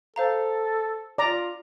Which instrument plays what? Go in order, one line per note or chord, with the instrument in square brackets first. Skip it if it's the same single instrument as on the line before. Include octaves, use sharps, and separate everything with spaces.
[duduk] A4 [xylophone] C5 F5 A#5
[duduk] F4 [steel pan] D5 A#5